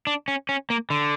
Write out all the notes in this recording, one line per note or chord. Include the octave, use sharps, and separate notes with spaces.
D4
C#4
C#4
A#3
D3